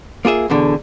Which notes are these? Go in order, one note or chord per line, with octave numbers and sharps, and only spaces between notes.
A#3 F4 G#4 E5
E2 B2 D3